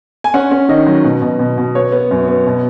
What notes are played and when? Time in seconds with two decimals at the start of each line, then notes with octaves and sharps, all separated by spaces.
0.24 G#5
0.34 C#4 F#5
0.51 C#4
0.69 D#3 D#5
0.87 F#3
1.05 B2
1.22 B2
1.39 B2
1.58 B2
1.75 B3 C#5
1.92 B3
2.11 F#2
2.28 B3
2.46 B2